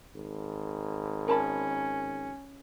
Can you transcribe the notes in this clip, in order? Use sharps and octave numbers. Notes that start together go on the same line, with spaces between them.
G#1
C#4 A#4 A5 B5